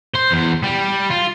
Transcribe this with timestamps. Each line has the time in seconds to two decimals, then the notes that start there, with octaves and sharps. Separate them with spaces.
0.15 C5
0.32 E2
0.64 G3
1.10 F4